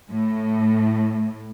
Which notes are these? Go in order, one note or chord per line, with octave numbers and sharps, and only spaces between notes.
A2